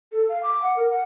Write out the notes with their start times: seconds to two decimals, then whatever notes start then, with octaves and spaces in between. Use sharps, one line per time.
0.12 A4
0.29 F5
0.43 D6
0.62 F#5
0.76 A#4
0.91 F#5